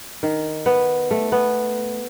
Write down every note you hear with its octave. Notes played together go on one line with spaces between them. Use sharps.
D#3
B3
A3
B3